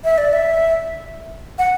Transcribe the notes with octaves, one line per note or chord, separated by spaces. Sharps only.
E5
D5
E5
F#5